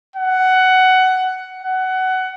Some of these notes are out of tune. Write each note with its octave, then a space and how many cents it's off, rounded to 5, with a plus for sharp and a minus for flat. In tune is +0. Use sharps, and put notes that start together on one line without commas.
F#5 +15
F#5 +20